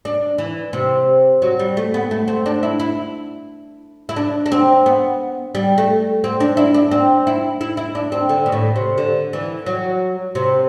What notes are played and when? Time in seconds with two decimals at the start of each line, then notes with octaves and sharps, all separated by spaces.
0.05 D4
0.38 E3
0.73 C3
1.42 F#3
1.59 G3
1.77 A3
1.94 B3
2.11 A3
2.28 C4
2.46 D4
2.63 E4
2.80 E4
4.09 E4
4.16 D4
4.46 D4
4.52 C4
4.86 B3
5.55 G3
5.78 A3
6.24 C4
6.40 D4
6.57 E4
6.74 D4
6.91 C4
7.27 E4
7.61 E4
7.77 E4
7.95 D4
8.12 C4
8.29 D3
8.46 B2
8.52 A2
8.76 C3
8.98 D3
9.33 E3
9.66 F#3
10.35 C3